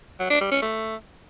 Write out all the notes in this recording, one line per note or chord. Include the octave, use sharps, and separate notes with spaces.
F#3
D4
G3
C#4
A3